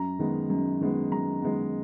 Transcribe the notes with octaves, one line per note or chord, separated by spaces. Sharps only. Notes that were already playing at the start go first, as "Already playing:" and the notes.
Already playing: F#2 A#5
D#3 G#3 B3
F#2
D#3 G#3 B3
F#2 A#5
D#3 G#3 B3